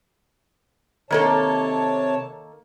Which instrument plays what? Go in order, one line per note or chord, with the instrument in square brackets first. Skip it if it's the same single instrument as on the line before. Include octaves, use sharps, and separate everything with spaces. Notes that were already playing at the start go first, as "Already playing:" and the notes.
[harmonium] C3 C#5 A5 [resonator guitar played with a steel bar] D#3 A#3 A4